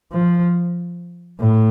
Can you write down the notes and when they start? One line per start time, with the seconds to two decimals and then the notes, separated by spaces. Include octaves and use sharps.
0.12 F3
1.40 A2